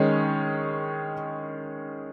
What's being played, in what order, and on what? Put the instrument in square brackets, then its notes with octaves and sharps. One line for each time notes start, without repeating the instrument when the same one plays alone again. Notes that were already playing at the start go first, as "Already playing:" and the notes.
Already playing: [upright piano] D#3 G#3 C#4